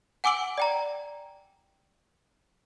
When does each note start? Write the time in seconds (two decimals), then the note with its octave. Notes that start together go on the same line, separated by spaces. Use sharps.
0.24 F#5 G#5 D6 E6 D7 F#7
0.58 D5 G5 A#5